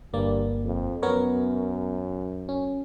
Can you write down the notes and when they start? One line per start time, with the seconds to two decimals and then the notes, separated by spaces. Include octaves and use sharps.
0.14 G1 G2 A#3 D5
0.64 F2
1.03 F#2 B3 A#4 C#5
2.49 C#4